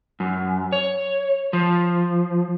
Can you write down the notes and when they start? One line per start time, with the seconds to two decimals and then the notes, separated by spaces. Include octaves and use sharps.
0.20 F#2
0.72 C#5
1.53 F3